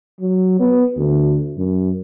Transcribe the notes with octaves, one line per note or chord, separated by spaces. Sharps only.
F#3
B3
D2
F#2